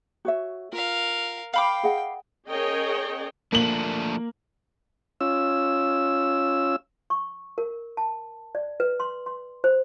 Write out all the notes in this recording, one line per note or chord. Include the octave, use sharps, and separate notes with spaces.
F#4 C#5 E5
F4 A#4 F5
F5 G5 B5 D6
G#4 D#5 F#5
C#4 G#4 A#4 C#5 D#5 G5
F3 A3 A#3 D4 F#7
C#4 F4 E6
C#6
A#4
A5
D5
B4
C6
C6
C5